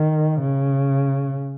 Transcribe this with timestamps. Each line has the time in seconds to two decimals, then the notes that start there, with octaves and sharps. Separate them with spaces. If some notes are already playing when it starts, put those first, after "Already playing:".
Already playing: D#3
0.41 C#3